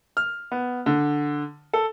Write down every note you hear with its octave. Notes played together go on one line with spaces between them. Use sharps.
F6
B3
D3
A4